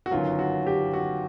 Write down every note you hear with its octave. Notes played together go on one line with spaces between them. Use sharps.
F#4
G1 F#2 D#3 F#3 F4
F#4
G4
F#4